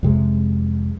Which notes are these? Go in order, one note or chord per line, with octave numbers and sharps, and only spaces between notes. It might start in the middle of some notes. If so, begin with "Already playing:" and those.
F2 C3 G#3